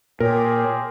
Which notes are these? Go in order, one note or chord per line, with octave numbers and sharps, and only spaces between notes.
A#2 C4 G4 G#4 A#4 C#5